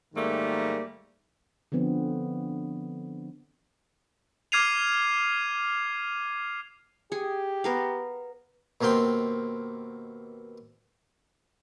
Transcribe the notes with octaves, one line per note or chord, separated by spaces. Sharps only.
G#2 D#3 G3 A3 A#3
D3 F3 B3 C4
D6 F6 G#6 C7 D#7 F7
G4 G#4
B3 A#4 F5
D#2 B2 A#3 C4 G5 C6